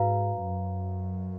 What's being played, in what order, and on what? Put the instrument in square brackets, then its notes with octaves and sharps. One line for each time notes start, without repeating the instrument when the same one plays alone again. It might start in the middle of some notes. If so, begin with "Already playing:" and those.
Already playing: [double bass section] G#2 [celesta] F#4 B4 F5 A#5
[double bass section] F#2